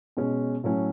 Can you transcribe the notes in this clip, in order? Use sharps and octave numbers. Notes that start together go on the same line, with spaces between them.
B2 G#3 C#4
A2 F#3 A3 C#4